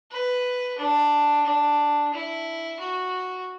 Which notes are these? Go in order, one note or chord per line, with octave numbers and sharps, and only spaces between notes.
B4
D4
D4
E4
F#4